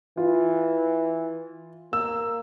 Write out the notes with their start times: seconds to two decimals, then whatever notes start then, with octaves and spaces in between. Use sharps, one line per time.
0.17 E3 F4
1.93 A#3 E6